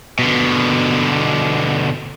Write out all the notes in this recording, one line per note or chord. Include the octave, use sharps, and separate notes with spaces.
B2 D3